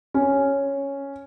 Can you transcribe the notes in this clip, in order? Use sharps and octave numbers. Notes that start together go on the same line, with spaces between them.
C#4